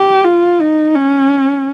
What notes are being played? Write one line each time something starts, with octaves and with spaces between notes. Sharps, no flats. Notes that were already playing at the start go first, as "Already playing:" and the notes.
Already playing: G4
F4
D#4
C#4